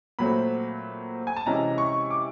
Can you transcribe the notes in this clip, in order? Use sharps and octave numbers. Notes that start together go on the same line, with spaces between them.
A#2 F#3 A3 C4 B5
G#5
A5
C3 E3 G#3 C#4 A#5
C#6
D6